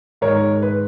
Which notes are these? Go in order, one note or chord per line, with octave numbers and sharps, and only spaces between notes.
G#2 D#3 G#3 A#4 C#5
B4